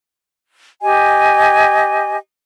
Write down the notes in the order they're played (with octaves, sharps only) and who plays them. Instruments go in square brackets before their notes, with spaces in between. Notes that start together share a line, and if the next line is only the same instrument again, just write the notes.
[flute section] G4 D#5 G#5